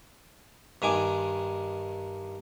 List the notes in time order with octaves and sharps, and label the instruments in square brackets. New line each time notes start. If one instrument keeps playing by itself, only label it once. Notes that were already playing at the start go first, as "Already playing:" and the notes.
[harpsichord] G2 D#3 G#5 D6